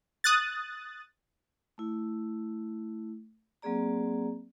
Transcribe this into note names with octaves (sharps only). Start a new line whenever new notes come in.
D#6 F#6 A6
A3 E4
F#3 A#3 C4 G#4 D5 A#5